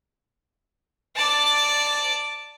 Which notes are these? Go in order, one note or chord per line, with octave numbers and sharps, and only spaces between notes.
D5 A5